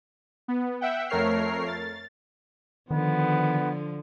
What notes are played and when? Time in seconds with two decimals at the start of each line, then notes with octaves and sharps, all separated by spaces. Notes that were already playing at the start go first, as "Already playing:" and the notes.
0.48 B3
0.81 E5 F#5 G5
1.10 F2 A3 A#4 C#5 F6 C7
1.68 A6
2.91 D3 D#3 F3 B3